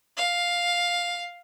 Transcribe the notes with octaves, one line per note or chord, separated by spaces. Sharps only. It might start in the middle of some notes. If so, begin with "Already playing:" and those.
F5